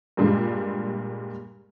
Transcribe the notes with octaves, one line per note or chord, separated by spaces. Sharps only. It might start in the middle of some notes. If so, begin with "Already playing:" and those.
G2 A#2 G3 G#3